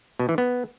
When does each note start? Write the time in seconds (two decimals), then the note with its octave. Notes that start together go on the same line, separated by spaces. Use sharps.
0.19 B2
0.29 E3
0.38 B3